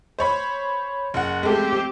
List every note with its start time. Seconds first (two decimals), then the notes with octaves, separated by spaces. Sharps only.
0.19 C5 C#5 B5
1.14 F#1 F#5
1.43 G#3 A3 C4 G4